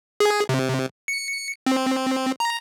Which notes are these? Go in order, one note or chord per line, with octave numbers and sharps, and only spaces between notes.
G#4
C3
C#7
C4
A#5